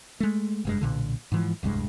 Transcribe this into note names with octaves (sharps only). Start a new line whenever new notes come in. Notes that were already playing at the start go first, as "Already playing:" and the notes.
G#3 A3
F1 G2 G#3
B1 A#2 D3
G#2 E3 F3
D1 C2 G2 G#3